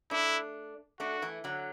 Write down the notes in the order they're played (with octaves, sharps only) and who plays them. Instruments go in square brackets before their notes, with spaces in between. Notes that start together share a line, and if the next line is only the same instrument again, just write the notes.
[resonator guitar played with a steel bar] A3 D4 [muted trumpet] E4
[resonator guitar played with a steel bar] A3 D4 [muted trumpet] F#4
[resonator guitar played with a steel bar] E3 A3
D3 F#3